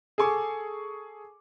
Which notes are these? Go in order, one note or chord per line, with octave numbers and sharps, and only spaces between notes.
G#4 A4 G#5 C#6 D6